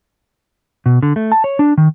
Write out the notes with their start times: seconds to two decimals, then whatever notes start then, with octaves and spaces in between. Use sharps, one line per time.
0.86 B2
1.03 D3
1.16 A3
1.32 A5
1.44 C#5
1.59 D4
1.78 D#3